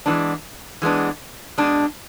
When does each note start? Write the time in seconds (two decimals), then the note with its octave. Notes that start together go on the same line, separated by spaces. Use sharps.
0.06 E3 G#3 B3 D4
0.82 E3 G#3 B3 D4
1.58 B2 G#3 D4